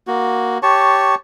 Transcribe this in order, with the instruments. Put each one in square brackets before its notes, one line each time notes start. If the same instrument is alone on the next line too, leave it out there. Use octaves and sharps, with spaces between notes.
[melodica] A#3 F#4
G4 C#5 A5 C#6